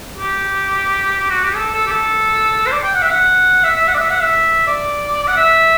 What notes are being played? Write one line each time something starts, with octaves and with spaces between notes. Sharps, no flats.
G4
F#4
G4
A4
A4
G4
A4
C5
D5
G5
F#5
E5
F#5
E5
E5
F#5
D5
E5
F#5
E5
D5
F#5
E5